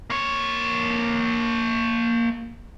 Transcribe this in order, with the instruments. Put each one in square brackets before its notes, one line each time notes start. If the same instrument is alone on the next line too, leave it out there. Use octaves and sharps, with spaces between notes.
[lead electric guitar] A#3 C#5